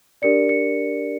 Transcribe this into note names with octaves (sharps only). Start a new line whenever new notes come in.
D4 G4 A#4 D5 C#7
C#7